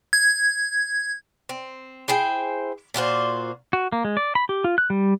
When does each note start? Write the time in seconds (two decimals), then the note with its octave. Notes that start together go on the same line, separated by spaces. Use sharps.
0.13 G#6
1.49 C4
2.08 E4 G#4 C5 G5
2.94 A#2 F4 F#4 C5
3.73 F#4
3.92 A#3
4.05 G#3
4.17 D5
4.35 B5
4.49 G4
4.64 F4
4.78 F#6
4.90 G3